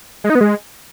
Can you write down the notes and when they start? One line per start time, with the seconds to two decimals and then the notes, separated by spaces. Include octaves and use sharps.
0.24 G#3
0.30 D#4
0.35 B3
0.41 G#3